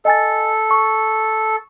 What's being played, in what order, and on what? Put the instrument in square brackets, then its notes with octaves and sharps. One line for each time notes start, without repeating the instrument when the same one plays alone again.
[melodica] A4 [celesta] D#5 G#5 A6
[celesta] C#6